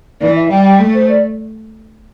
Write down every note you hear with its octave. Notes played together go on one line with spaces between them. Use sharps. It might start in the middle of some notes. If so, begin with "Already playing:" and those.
E3 D5
E5
G3 G5
G5
A3
C5
D5